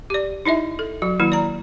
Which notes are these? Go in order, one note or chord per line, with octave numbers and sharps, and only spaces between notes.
G4 D5
D#4 E4 D#5 E5
A4
F#3 F#4
D#3 F#3 A#3 E4
D5 A#5